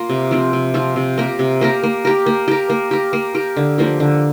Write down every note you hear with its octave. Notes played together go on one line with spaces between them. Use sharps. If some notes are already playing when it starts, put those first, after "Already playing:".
Already playing: A#3 F4
C3
F3 C4 F4
C3
F3 C4 F4
C3
A#3 G4 A#4
C3
A#3 G4 A#4
A#3
G4 A#4
A#3
G4 A#4
A#3
G4 A#4
A#3
G4 A#4
D3
F3 A#3 G4
D3